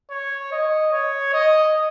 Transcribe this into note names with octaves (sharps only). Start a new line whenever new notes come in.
C#5
D#5
C#5
D#5